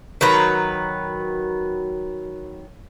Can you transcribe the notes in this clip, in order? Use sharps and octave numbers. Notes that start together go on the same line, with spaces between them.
D#3 F#3 B4 A#5